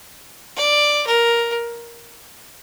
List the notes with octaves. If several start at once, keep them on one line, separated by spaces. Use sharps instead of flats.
D5
A#4